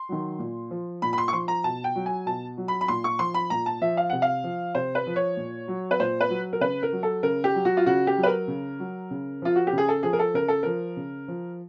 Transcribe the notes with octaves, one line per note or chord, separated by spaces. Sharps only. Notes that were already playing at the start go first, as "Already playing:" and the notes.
Already playing: C6
D#3 F#3
A#2
F3
A#2 B5
B5
C6
C#6
F3 C6
A#5
B2 A5
G5
F#3
G#5
B2 A5
F#3
B5
B5
A#2 C6
C#6
F3 C6
B5
A#2 A#5
A5
F3 E5
F5
C3 F#5
F5
F3
C3 C5
B4
F3
C#5
A#2
F#3
B4
A#2 C5
B4
F#3
A#4
C#3 B4
A#4
F#3
A4
C#3 A#4
G4
F#3
F#4
F4
C#3 F#4
G4
F#3
B4
A#4
C#3
F#3
C#3
F3 F4
F#4
G4
C#3
G#4
A4
F3 G#4
A#4
A4
C#3 A#4
A4
F3 A#4
C#3
F3